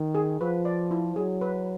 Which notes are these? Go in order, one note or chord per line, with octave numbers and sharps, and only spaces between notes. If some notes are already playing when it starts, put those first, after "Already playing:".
Already playing: D#3
G#4
F3 B4
D5
E4
F#3 G#4
B4